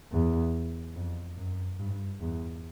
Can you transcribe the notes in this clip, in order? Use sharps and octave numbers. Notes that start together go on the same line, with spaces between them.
E2
F2
F#2
G2
E2